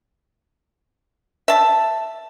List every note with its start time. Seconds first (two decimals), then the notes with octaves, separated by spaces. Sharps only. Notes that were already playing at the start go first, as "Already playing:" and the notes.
1.48 E5 A5